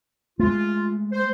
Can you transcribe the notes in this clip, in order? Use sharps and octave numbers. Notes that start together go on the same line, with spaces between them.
G#3 A3 F4
C5